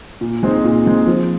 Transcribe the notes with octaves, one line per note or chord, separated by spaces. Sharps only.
A#2
G#3 C4 D#4
A#2
G#3 C4 D#4
F3